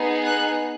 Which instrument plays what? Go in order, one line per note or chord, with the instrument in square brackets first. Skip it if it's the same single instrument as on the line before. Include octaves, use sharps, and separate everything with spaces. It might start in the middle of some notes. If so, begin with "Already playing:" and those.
Already playing: [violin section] B3 D#4 G#4
F#6